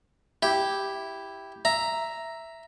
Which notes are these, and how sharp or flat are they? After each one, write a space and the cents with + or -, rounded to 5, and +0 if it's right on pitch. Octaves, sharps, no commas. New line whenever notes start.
E4 +0 G4 +0
E5 +0 A#5 +0